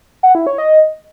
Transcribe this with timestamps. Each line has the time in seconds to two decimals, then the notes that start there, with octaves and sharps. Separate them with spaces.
0.23 F#5
0.35 E4
0.47 C#5
0.58 D#5